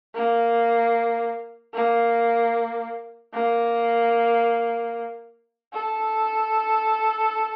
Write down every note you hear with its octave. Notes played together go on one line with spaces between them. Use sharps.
A#3
A#3
A#3
A4